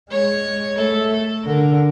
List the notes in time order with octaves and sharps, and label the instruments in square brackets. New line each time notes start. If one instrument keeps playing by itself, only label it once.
[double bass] G#3 [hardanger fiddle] C#5
[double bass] A3 [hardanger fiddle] A4
[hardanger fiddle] A4
[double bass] D3 [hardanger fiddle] A#4